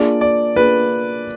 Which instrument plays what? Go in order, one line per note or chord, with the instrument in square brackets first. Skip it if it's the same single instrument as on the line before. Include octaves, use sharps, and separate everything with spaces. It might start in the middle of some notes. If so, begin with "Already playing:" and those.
Already playing: [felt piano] A#3 D4 F4 G#4 [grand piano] D5
[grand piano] D5
[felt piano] A#3 D4 F4 G#4 [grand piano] B4